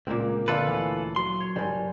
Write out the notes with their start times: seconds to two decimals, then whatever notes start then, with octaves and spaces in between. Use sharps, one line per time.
0.07 C#2 A#2 A#3 C4
0.48 D3 F4 A4 B4 D5 F5
0.67 D2 E3 C#4
1.16 F#3 C6
1.40 C#5
1.56 F#1 G2 G3 G#5